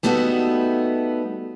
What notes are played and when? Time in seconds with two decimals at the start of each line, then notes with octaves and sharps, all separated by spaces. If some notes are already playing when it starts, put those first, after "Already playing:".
0.03 G3 A3 B3 D#4 F#4 A4